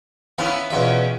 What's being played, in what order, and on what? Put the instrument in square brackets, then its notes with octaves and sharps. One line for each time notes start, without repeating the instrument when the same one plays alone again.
[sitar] B3 C#4 E4 [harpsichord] F5 A#5
[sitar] E2 C#4 [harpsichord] B2 F4 E5